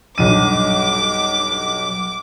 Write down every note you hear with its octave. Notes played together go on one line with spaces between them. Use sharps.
B1 G2 D6 D#7